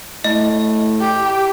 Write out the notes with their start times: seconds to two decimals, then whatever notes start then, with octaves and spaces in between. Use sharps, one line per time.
0.24 A2 D#5
1.01 G4